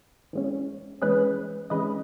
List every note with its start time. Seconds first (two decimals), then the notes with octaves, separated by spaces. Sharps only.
0.33 E3 G#3 C#4
1.02 E3 G#3 C#4 G#4 B4
1.70 E3 G#3 C#4 B4 D#5